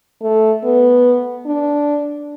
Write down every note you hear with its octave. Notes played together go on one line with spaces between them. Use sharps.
A3
B3
D4